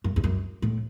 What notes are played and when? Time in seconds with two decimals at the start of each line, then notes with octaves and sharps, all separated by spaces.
0.04 F#2
0.16 E2
0.24 F#2
0.62 A2